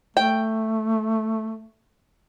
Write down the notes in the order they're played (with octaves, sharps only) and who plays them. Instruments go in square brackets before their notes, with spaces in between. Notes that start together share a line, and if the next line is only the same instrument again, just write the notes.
[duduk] A3 [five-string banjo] G5